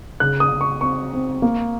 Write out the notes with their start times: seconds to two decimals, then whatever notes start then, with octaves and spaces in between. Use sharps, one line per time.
0.20 C#3 F#6
0.40 D#6
0.51 C#3
0.61 C#6
0.81 C4 C#6
1.13 C4
1.42 A#3